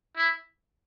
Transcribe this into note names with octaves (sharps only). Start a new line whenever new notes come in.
E4